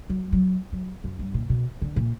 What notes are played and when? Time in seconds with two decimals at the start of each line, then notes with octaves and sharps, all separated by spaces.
0.09 F#3
0.33 F#3
0.73 F#3
1.04 F#2
1.19 G2
1.34 A#2
1.50 B2
1.82 D3
1.96 A#2